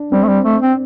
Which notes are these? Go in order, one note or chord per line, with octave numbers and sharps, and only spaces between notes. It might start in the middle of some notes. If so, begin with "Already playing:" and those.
Already playing: D4
G3 C4
A3
G3
A3
C4